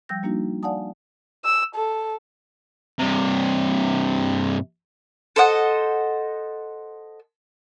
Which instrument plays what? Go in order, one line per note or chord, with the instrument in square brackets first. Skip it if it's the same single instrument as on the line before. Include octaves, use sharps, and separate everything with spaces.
[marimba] F3 G3 G5 E6 G6 A#6
G3 A#3 D4 D#4 F#4
D5 F5 F#5 G#5 A5 D#6
[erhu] E6
A4
[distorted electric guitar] G2 C3
[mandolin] A4 C5 D#5 F#5